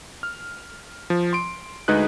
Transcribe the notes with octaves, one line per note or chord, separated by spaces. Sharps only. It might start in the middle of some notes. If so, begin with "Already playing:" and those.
F6
F3
C6 D7
D2 G#3 D#4 G#4 B4 F#6